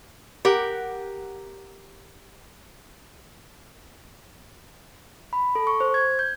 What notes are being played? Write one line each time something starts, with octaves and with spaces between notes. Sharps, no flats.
G4 A#4 F#5
B5
A4
C#6
C5
G#6
G6